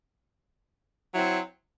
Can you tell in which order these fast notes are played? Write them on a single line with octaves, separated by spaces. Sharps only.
E4 F#3 C4